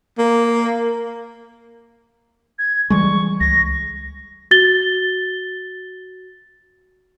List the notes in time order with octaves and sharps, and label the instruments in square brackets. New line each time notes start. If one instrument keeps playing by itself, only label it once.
[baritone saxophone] A#3
[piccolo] G#6
[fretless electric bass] E3 G3 G#3 [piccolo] C#6
[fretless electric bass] C#2 [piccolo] A#6
[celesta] F#4 A6 G7